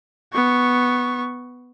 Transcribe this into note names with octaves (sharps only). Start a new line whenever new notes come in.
B3 C#6